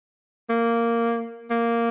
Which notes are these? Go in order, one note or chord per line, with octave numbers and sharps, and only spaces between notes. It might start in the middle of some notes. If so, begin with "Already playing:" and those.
A#3
A#3